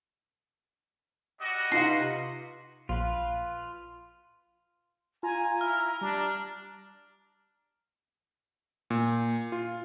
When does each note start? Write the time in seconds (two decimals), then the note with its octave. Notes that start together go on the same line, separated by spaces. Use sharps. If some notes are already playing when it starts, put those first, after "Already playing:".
1.40 G3 F#4 D#5
1.72 C3 D#4 F4 B4 F5 C6
2.89 A#1 F4 B4
5.23 F4 G#5 A#5
5.61 E4 F6
6.01 G3 D4
8.90 A#2
9.52 F4